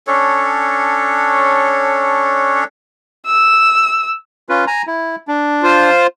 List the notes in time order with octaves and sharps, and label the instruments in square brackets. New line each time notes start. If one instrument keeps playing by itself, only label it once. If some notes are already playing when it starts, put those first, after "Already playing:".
[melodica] C#4 D4 A4 C#5
[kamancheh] E6
[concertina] C#4 F4 B4
G#5 A#5
E4
D4
[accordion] F4 C5